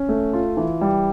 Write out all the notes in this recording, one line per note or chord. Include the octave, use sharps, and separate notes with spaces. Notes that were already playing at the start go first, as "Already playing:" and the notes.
Already playing: C#4
A3
F4
E3
G3